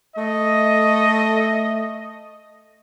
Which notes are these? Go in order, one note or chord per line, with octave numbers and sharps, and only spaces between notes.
A3 D#5